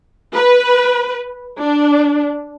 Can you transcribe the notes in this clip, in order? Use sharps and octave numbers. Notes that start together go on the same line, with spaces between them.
B4
D4